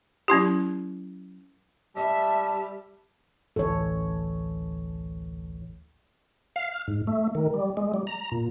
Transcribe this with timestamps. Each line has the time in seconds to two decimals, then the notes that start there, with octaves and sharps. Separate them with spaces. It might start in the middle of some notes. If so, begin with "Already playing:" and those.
0.28 F#3 C#4 E4 G4
1.96 G3 E5 A5
3.56 A1 D2 E3 A4 C#5
6.56 F5
6.72 F6
6.87 G#2
7.07 A3
7.35 D#3
7.54 G3
7.77 G#3
7.94 G3
8.07 A#5
8.32 A#2